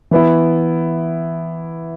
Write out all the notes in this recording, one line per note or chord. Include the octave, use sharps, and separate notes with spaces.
E3 B3 E4